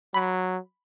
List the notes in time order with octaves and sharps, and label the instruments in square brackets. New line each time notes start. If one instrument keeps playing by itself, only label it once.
[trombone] F#3 [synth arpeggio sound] B5